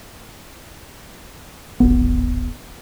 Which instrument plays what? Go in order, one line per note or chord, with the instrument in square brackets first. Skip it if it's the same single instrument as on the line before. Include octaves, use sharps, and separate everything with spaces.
[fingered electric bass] D1 G#1 B3